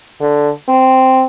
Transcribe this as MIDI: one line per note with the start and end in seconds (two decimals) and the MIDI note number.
0.21 0.50 50
0.69 1.24 60